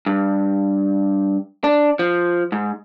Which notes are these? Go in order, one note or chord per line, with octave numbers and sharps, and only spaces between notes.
G2
D4
F3
G#2